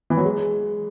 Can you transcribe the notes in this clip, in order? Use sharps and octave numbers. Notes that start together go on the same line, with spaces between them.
E3
F#3
G#3